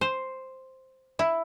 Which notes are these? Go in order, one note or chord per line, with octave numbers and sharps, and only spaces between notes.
C5
E4